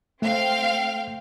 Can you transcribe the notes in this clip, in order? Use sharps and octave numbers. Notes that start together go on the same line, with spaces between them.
A3 C4 F5 G5